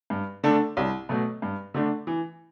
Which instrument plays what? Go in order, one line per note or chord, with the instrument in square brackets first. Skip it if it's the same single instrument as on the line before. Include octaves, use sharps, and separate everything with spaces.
[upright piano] G2
D3 A3 D4 A4
C2
B2 F#3 A3
G2
D3 A3 D4
E3